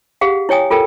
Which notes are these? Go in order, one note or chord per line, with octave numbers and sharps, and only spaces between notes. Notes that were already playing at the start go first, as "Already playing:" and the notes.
G4 G#4 F5 F#5
E4 C#5 G5 G#5 D#6
F4 A4 A#4 G5